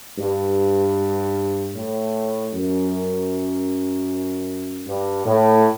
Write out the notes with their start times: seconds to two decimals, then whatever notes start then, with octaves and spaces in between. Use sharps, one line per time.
0.18 G2
1.74 A2
2.53 F#2
4.87 G2
5.25 A2